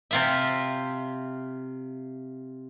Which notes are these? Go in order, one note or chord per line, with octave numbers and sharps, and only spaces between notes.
C3 F4 E5